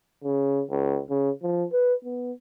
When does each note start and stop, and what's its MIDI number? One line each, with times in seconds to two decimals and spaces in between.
0.24 0.63 49
0.70 0.99 37
1.10 1.30 49
1.43 1.64 53
1.73 1.94 71
2.04 2.32 59